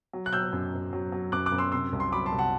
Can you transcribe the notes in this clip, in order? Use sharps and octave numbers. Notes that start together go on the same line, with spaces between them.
F#3
F#6
F#3 E6 G6
F#2
F#2
F#3
F#3
F#2 D6 F#6
D6 F#6
F#2
C6 E6
C3 C6 E6
C2
C6
F#3 B5 D6
A5 C6
C2
F#5 A5